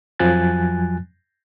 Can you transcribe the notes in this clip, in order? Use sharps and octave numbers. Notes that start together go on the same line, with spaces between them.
F2 F3 F#3 G#5 F#6 A6